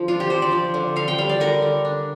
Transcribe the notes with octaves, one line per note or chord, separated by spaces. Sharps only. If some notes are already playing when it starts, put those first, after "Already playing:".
Already playing: D3 F3
D4 F4
G4
F3 C5
D5
F3
D3
D3 F5
G5
G3 F5
D5
D3 A#4
D3
D4